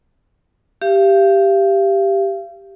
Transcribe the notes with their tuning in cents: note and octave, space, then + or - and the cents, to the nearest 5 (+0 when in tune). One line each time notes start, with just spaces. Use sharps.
G4 +0 F5 -40